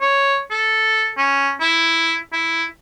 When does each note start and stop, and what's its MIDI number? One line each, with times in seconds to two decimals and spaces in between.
0.01 0.40 73
0.51 1.10 69
1.17 1.52 61
1.60 2.16 64
2.33 2.64 64